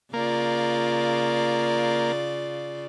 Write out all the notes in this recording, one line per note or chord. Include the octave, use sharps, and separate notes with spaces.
C#3 A#3 F4 D5